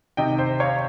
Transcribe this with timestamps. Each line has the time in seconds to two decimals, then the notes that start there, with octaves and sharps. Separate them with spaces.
0.17 C3 D#3 D#5 G5
0.38 C5
0.60 C#5 F5